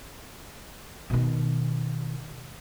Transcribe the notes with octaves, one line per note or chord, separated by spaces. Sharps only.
B2 D#3